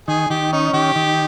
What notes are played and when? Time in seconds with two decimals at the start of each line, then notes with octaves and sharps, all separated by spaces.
0.08 D#3 G#4
0.30 D#3 G4
0.53 C#4 D#4
0.74 D#3 G4
0.96 D#3